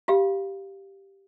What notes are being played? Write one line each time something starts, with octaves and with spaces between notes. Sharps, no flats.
F4 G4 F5